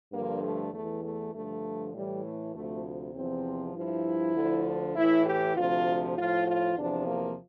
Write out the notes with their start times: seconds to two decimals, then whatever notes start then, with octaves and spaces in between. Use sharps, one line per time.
0.13 G2 D3 F3 A#3
0.43 A3
0.73 E2 E3 A3
1.04 A3
1.34 G2 D3 F3 A3
1.94 A2 E3 G3
2.24 A3
2.54 D2 C3 F3 A3
3.15 E2 C3 F3 C4
3.75 G2 F3 E4
4.35 D2 D3 F3
4.95 A2 E3 E4
5.26 G4
5.56 D2 C3 F3 F4
6.16 A2 F3 F4
6.46 F4
6.76 E2 C3 F3 D4
7.07 A#3